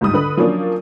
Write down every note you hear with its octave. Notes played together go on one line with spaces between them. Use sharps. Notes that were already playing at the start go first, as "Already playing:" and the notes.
C#2 G#2 G3 D#6
D3 B4 B5
F3 F#3 A#3 C#4 D4